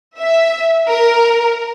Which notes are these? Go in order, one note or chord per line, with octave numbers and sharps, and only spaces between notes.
E5
A#4